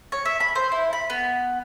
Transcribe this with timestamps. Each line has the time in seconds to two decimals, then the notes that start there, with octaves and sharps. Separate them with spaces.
0.12 C#5
0.25 E5
0.40 B5
0.55 C5
0.72 E4
0.93 B5
1.10 B3